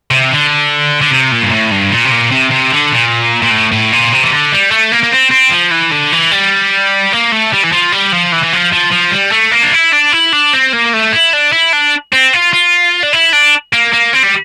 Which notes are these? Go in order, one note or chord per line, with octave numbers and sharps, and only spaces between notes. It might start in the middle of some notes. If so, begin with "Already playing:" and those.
C3
D3
D3
C3
A#2
G2
A2
G2
A#2
C3
A#2
C3
C3
D3
A#2
A#2
A2
A2
A#2
C3
E3
D3
G3
A3
A#3
A#3
C4
C4
F3
E3
D3
E3
G3
A#3
A3
G3
E3
F3
G3
F3
E3
E3
F3
F3
F3
G3
A3
A#3
D4
E4
D4
E4
D4
C4
A#3
A3
E4
D4
E4
D4
C4
F4
F4
D4
E4
D4
A#3
A#3
C4
G3